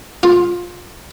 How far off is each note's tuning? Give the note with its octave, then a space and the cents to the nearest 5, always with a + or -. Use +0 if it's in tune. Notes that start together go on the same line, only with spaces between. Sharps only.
F4 +15